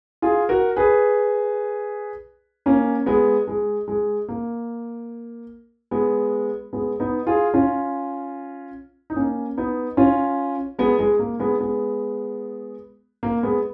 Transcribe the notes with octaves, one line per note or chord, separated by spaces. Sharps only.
F4 G#4
F#4 A#4
G#4 B4
A#3 C#4
G#3 B3
G#3
G#3
A#3
G#3 B3
G#3 B3
B3 D#4
F4 G#4
C#4 F4
D#4
A#3 C#4
B3 D#4
C#4 F4
G#3 B3
G#3
A#3
G#3 B3
G#3 B3
A#3
G#3 B3